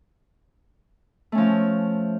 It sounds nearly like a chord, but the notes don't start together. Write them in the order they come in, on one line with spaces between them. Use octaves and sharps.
A3 C#4 F3